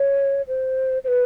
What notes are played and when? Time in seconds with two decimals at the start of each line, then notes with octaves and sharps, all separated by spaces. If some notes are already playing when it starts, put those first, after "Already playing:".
Already playing: C#5
0.48 C5
1.04 C5
1.08 B4